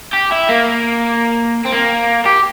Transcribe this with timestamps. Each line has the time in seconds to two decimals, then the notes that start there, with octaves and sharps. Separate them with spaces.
0.13 G4
0.31 E4
0.49 A#3
1.66 C4
1.72 A#3
2.26 G4